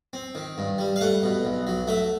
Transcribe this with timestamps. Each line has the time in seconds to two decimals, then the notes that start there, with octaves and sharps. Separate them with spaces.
0.13 C4
0.35 D#3
0.58 G2
0.78 G3
0.96 F5
1.01 A3 F#5
1.23 B2
1.45 B1
1.67 F#3
1.88 A3 E5